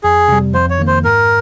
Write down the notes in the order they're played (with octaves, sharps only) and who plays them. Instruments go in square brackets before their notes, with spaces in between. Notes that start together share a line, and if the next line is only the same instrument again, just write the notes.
[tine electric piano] F2 [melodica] G#4
[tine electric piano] C3 G3
[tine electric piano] F2 [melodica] C5
[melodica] C#5
[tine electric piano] D#3 A#3
[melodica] C5
[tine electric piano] G#2 [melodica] A#4